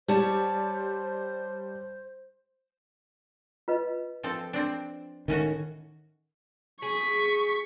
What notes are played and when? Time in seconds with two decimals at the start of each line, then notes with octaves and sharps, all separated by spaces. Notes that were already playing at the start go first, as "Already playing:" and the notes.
0.08 G3 C5 C#5 A5
3.68 F4 B4 D#5
4.23 F3 C4 A4
4.53 C4 D4
5.28 A2 D#3 C#4 F#4
6.82 G#4 C#6 B6